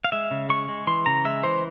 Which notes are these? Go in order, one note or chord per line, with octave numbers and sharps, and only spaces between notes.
F5
G#3 E5
C#3
G#3 C#6
G#3
E3 C6
C#3 A#5
G#3 E5
E3 C5